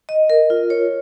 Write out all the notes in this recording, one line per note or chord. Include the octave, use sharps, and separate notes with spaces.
D#5
A#4
F4
C#5